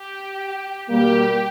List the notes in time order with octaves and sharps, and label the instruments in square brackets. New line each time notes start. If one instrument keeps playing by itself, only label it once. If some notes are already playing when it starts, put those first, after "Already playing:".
Already playing: [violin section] G4
[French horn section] B2 G3 A#3 [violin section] G4